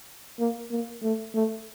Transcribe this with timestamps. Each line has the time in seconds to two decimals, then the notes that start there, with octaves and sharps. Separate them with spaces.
0.40 A#3
0.71 A#3
1.03 A3
1.35 A3